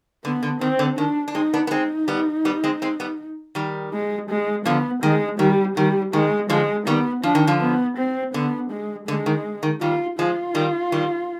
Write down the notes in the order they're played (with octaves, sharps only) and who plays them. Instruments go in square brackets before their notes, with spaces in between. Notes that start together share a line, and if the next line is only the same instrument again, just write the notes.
[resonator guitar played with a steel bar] D3 [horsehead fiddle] B3
[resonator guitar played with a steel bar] D3
[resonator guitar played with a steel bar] D#3 [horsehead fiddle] C4
[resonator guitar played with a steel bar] D3
[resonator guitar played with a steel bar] D#3 [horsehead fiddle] D4
[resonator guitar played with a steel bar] D4
[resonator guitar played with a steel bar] G#3 C4 [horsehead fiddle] D#4
[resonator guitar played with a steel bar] B3 D4
B3
[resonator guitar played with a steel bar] G#3 C4 [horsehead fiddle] D#4
[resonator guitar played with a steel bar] G3 B3
G3 B3
G#3 C4
G#3 C4
G3 B3
D#3 G3
[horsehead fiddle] G#3
G#3
[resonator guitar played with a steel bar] D3 F3 [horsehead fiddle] B3
[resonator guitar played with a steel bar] D#3 [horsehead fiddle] G#3
[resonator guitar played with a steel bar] D#3 [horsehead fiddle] G3
[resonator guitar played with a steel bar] D#3 [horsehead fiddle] G3
[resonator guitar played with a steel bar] D#3 [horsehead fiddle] G#3
[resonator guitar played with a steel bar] D3 F3 [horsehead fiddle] G#3
[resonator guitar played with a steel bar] D#3 G3 [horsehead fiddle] B3
[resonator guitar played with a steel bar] F3 [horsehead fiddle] D4
[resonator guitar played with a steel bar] D#3
D3 F3
[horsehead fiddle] B3
C4
[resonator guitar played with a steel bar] D3 [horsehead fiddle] B3
[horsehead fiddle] G#3
[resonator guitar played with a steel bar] D3 [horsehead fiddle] G#3
[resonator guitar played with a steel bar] D#3
D#3
[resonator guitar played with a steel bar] D#3 G3 [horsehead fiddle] F4
[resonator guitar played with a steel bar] F3 G#3 [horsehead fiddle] F4
[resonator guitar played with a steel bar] D#3 G3
D#3 G3